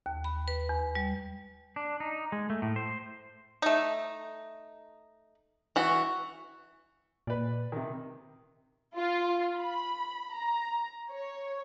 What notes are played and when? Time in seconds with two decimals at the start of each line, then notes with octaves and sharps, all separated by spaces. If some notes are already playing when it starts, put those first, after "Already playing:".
0.06 D#2
0.24 B5
0.48 B4
0.69 E2
0.95 G3
1.76 D4
2.00 D#4
2.32 G#3
2.50 A3
2.62 A2
2.76 C5
3.62 A3 D#4
5.76 E3 F#4
7.27 A#2 B4 D5
7.72 C3 D#3
8.96 F4
9.57 B5
10.33 A#5
11.11 C#5